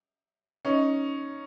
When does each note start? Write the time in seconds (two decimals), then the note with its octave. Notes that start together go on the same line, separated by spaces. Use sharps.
0.65 C#4 D#4